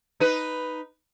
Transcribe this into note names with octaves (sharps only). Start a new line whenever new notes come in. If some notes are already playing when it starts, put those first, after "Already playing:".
D#4 B4